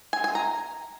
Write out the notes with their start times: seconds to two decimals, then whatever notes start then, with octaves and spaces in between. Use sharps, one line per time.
0.13 G#5
0.24 G#5
0.35 A#5